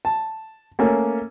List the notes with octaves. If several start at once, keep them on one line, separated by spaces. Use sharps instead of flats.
A5
A3 A#3 C#4